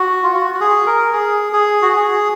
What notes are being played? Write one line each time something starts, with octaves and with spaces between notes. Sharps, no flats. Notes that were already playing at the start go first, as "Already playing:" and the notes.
Already playing: F#4
F4
F#4
F#4
G#4
A#4
G#4
G#4
F#4
G#4